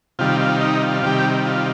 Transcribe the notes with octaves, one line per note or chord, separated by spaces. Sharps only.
C3 D#3 G3 F4
F4
D#4
F4
C3 D#3 G3 G4
F4